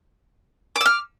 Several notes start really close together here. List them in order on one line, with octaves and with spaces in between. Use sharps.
D6 E6 F6